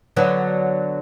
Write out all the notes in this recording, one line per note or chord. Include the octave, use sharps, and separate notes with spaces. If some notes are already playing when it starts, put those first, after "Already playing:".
D3 F#3 B3